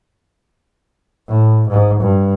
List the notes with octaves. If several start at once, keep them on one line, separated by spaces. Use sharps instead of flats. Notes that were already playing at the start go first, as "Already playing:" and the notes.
A2
G#2
G2